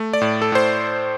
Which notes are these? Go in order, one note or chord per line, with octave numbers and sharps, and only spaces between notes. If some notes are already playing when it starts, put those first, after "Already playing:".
Already playing: A3
D5
A2
A4
A2 C5